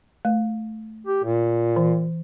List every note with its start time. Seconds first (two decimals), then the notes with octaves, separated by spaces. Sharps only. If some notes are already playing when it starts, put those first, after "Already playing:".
0.25 A3
1.07 G4
1.24 A#2
1.76 E3